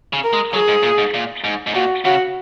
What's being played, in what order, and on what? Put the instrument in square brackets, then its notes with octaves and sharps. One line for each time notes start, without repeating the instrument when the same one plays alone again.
[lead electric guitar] C#3
[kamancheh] A#4
[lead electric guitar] G#3
[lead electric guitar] F#3 [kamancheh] G#4
[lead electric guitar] G#2
A#2
G#2
A#2
G#2
G#2
[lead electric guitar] A#2 [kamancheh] F#4
[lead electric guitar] C#3 [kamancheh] F#4